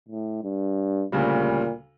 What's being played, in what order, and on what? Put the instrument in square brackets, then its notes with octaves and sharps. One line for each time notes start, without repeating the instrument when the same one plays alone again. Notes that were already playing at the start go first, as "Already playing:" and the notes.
[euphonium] A2
G2
[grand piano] D2 C#3 G3 [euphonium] A#2